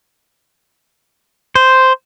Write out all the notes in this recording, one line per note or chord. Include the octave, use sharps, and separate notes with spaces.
C5